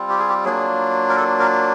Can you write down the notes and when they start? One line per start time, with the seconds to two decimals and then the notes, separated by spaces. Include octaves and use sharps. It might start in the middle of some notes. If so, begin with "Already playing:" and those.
Already playing: G3 C4 F4
0.09 G4
0.19 G#4
0.29 G4
0.44 F#3 A#3 D4 F4 G#4
1.09 A#4
1.17 A4
1.40 A#4